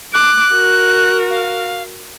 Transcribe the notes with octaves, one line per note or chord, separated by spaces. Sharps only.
D6 F#6
F#4 A#4
F5